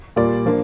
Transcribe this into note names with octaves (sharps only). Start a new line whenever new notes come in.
A#2 G3 A#3 F4 D5
F3 A#3 D4